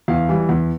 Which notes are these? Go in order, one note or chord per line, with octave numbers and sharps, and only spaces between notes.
E2 F5
E3 G3
E2